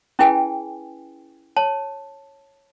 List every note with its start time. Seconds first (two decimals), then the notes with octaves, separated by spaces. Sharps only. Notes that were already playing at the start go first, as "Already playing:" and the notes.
0.19 C#4 E4 G#4 B4 G5 G#5
1.56 C#5 A5